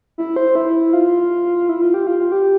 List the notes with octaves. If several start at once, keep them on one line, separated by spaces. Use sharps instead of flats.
E4
C5
E4
F4
E4
F4
G4
F4
F4
G4